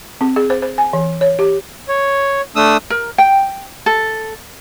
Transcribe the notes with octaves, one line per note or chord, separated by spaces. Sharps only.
C4
G#4
C5
C5
G#5
E3
C#5
G4
C#5
A3 D4 D#6 E6
A#4
G5
A4